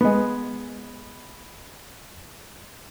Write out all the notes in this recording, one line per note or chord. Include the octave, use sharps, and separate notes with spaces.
G#3 B3